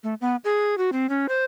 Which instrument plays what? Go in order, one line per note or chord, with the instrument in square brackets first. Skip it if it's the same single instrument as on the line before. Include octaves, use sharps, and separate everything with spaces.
[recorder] A3
B3
G#4
F#4
C4
C#4
C5